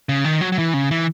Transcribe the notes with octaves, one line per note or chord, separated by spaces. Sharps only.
C#3
D#3
F#3
F#3
E3
C#3
E3